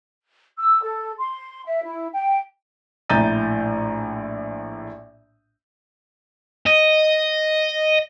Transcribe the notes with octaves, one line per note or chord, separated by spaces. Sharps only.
E6
A4
C6
E5
E4
G5
A#1 A2 A#5 G6 A6 D#7
D#5